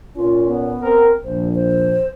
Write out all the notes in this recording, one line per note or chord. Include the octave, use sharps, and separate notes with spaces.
A#2 C#4 F4
B3
C4 A#4
A#1 C5
C5